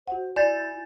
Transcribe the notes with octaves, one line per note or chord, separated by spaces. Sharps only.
F#4 C5 F#5
E4 D5 G#5 G6 A6